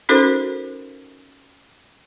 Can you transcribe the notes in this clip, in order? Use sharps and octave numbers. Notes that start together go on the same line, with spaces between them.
C#4 D#4 F#4 A4 A#4 C5